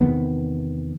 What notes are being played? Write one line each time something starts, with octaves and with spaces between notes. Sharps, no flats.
E2 C3 D#3 B3